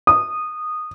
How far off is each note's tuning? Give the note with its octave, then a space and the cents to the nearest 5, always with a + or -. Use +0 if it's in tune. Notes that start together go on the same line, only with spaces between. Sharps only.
D#6 -15